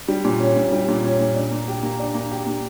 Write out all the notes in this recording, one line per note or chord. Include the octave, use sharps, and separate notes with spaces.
G3
A#2
C#4
A#2
G3
A#2
C#4
A#2
D4
A#3
G4
A#3
D4
A#3
G4
A#3